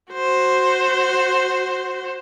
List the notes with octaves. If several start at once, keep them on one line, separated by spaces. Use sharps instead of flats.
F#4 C5